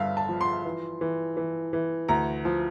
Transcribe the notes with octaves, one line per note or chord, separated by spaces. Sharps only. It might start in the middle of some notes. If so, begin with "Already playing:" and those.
Already playing: G1 G2 E5 F5
A5
F3
C6
E3
E3
E3
E3
D2 A#5
F3